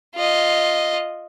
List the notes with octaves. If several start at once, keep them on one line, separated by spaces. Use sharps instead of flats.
F4 D#5